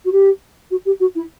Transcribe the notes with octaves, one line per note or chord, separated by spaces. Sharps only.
F#4
G4
F#4
G4
F#4
E4